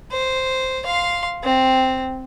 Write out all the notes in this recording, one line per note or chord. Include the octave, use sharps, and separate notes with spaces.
C5
F5 C6
C4